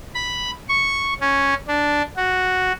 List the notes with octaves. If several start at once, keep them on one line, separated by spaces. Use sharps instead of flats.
B5
C#6
C#4
D4
F#4